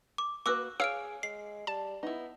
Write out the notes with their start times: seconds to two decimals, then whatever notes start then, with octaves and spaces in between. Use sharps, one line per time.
0.18 D6
0.46 A#3 F#4 B4 D6 E6 F#6
0.80 G#4 C#5 F5 E6 F6 D7
1.23 G#3 C7
1.67 G3 A5
2.03 B3 D#4 E4